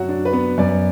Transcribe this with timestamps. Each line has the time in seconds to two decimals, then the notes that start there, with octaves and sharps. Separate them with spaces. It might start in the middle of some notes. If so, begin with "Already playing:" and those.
Already playing: F#2 F#3 F#4 F#5
0.09 D4
0.25 B4
0.33 B3
0.58 F#2 D5